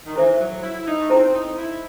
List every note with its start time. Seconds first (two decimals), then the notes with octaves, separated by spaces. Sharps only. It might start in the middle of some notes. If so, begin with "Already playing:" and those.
0.05 D#3
0.15 E3 E4 A4 C5 E5
0.40 F#3
0.63 E4
0.86 D#4
1.00 A3
1.10 C4 E4 A4 C5
1.34 D#4
1.57 E4